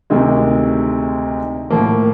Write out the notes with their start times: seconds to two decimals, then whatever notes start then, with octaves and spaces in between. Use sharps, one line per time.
0.10 D2 C3 D#3 G#3
1.70 A2 F3 A#3